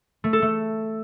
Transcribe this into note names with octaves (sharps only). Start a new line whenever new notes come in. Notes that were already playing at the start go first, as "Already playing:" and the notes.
A3
A4
A3